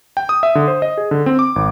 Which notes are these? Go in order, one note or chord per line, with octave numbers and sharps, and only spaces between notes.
G5
D#6
E5
D3
C5
D#5
G#4
D3
C4
D6
G#1